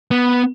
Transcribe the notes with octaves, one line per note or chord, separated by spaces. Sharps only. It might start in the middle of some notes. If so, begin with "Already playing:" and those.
B3